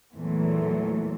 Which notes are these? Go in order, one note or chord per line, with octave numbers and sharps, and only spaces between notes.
E2 A#2 E3 F#3 A3